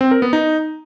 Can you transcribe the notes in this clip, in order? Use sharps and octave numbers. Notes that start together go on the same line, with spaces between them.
C4
A#4
B3
D#4